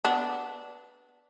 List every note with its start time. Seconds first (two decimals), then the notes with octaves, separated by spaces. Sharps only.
0.05 B3 D4